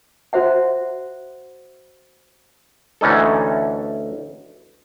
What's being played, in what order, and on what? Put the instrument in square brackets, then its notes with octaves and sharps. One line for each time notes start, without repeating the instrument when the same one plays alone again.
[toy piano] F#4 C5 E5 F#5
[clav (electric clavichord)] D2 E3 C#4 D#4 A4